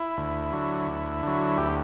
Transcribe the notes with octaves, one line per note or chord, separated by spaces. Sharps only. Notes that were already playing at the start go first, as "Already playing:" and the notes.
Already playing: E4
D2
D3 F#3
D2
D3 F#3
D2 G4